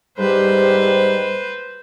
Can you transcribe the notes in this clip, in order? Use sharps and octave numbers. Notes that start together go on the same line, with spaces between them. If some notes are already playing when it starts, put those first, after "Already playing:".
G#2 G3 B4 C5